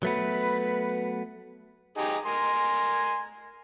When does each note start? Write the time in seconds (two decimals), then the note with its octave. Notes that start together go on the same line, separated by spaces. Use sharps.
0.03 F#3 A3 B3 B4
1.98 D#4 G4 G#4
2.25 A#4 G#5 C6